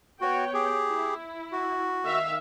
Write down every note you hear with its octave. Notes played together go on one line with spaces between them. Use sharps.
B3 F#4 C#5 G5
G4 G#4
E4
F#4
D#3 E5 F5